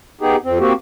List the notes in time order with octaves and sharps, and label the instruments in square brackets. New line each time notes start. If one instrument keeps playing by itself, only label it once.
[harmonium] B3 D#4 G4 G#4
F2 C4
A#3 C4 F#4 G4